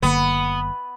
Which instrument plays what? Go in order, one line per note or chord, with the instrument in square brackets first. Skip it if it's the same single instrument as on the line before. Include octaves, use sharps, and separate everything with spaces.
[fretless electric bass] F#1 D3 A#3 [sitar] B3